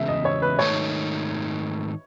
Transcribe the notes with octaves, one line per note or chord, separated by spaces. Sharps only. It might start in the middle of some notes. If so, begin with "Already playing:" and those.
Already playing: E2 C#3 G#3 E5
D#5
C#5
B4
G#2 D#3 A3 D#4 C#5